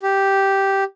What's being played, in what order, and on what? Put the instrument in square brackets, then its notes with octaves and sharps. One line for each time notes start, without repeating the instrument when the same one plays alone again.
[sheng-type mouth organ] G4